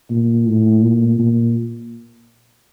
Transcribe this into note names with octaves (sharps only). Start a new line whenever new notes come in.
A#2
A2
A#2
A#2